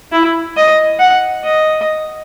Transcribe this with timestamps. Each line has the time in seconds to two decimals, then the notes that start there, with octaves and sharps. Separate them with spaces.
0.12 E4
0.57 D#5
1.00 F#5
1.44 D#5